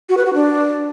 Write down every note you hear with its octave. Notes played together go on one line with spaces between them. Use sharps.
F#4
B4
F#4
D4